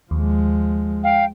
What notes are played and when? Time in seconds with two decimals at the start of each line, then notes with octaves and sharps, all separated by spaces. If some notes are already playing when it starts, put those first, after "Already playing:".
0.11 D#2 F3 G#3
1.04 F5 G5